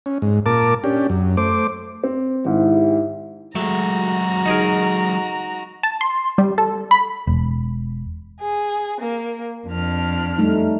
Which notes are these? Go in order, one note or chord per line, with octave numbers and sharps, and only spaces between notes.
C#4
G#2
A#2 A#4 A5 D6
C#4 D4 G4
F#2
A3 C5 D6
C4
G#1 G#2 E4 G4
F#3 G#3 A3 F#4 A#5
D#4 G#4 A#4
A5
C6
G3
A4
B5
E1
G#4
A#3
F2 D4 F6
G3 A3 D#4